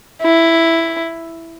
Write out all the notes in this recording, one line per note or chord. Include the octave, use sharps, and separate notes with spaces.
E4